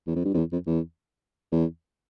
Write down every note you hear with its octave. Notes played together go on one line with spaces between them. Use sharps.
E2
F2
G2
F2
E2
F2
E2
E2